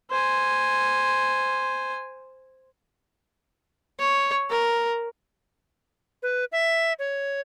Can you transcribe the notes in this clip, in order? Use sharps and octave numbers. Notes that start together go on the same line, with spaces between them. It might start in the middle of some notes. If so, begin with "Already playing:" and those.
C5 G#5
C#5
A#4
B4
E5
C#5